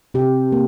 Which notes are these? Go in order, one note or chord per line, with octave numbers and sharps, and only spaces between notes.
C3 G4
A#3